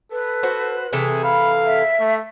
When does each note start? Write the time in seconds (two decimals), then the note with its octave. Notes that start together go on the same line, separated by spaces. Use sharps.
0.12 A4 B4
0.43 F#4 C5
0.93 C3 E3 G#4 A4
1.24 F5 B5
1.65 E5
2.00 A3